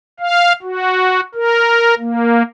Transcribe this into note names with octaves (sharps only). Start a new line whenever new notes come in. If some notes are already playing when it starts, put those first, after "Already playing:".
F5
F#4
A#4
A#3